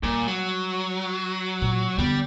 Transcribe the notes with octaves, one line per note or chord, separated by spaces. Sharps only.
A#2 G3
F#3
A#2
D3 G3 B3